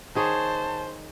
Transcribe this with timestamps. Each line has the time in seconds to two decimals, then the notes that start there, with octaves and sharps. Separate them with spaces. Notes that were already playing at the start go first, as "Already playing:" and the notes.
0.15 D#3 G#4 C5 C#5 A5